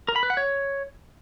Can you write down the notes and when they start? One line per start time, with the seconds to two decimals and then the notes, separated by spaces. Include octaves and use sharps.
0.08 A#4
0.16 B5
0.23 B4
0.30 F#5
0.37 C#5